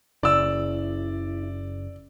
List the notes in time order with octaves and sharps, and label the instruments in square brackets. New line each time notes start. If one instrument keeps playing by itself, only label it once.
[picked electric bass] F#1 C#3 [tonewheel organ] E4 [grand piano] D5 E6